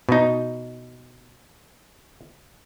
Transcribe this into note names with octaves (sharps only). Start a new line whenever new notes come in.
B2 D#4